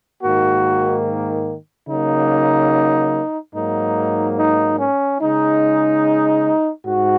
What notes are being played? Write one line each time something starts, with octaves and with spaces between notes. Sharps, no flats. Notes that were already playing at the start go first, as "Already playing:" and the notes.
G#2 D#3 A#3 F#4
C#3 F#3 A#3 D#4
G#2 F#3 A#3 D#4
D#4
C#4
C#3 G#3 D#4
G#2 F#4